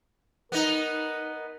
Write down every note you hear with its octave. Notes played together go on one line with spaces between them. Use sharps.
B3 D#4 A#4